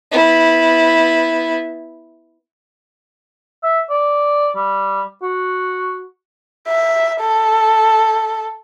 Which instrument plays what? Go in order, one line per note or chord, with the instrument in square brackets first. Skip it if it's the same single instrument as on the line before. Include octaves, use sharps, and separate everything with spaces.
[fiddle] B3 E4
[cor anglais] E5
D5
G3
F#4
[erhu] E5
A4